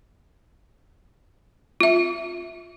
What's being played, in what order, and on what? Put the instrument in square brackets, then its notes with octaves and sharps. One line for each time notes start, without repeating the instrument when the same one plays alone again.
[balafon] F4 E5